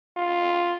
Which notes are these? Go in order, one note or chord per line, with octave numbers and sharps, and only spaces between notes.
F4